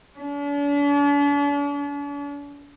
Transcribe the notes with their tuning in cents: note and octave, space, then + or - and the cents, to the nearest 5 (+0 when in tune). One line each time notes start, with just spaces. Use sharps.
D4 -45